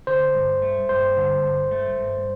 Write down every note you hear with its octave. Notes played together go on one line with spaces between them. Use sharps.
D3 C5
G2
A3
G2 C5
D3
G2
A3
G2